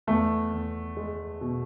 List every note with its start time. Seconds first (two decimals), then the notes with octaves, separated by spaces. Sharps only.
0.07 E2 A3
0.52 E2
0.97 G#3
1.41 B2